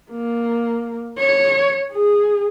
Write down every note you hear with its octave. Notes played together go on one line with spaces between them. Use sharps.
A#3
C#5
G#4